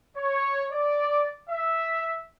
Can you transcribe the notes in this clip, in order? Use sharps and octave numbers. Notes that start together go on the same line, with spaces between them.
C#5
D5
E5